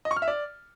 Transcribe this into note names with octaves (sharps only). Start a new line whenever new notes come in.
D#5
C#6
F6
E5
D5